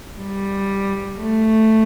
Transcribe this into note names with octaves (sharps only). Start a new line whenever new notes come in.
G3
A3